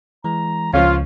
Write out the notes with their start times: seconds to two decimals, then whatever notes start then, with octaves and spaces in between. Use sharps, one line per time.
0.24 E3 G#3 A#5
0.73 C#2 F3 C#4 F4 F5